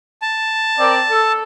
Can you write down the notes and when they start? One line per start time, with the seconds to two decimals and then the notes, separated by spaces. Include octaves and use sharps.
0.22 A5
0.79 C4 A#4 D5
1.10 A4